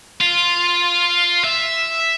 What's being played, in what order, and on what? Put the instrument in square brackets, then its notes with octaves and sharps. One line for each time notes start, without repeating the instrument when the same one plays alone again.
[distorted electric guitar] F4
E5